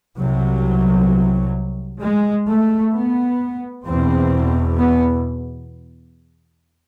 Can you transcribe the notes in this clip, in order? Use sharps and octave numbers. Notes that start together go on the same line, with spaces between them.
C2 C3 F#3
G#3
A3
B3
E2 B2 C4
B3